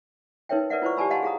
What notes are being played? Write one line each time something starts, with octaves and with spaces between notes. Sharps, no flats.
D#4 A#4 B4 C#5 E5 G5
A#4 B4 D5 E5 F#5
E4 F4 B4 C5 D5 C#6
G4 D5 G#5 A5 B5 E6
D#5 F5 F#5 A5 B5 C6
G#4 F5 A#5 D#6